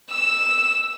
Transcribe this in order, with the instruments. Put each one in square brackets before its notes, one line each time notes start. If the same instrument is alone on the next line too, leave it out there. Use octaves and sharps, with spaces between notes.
[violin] E6 E7